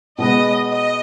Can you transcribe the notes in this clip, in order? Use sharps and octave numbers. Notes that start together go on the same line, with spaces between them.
B2 G#3 B3 D#5
D#5